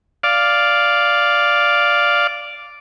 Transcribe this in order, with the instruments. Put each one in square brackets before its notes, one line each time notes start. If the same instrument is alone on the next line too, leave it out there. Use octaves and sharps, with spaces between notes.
[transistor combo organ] D5 F5